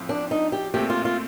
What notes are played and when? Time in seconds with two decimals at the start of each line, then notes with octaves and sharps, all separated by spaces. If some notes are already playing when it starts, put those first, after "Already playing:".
Already playing: A2 F3 C4 F4
0.09 D4
0.31 D#4
0.52 G4
0.74 A#2 A3 C4 G4
0.90 F4
1.05 F4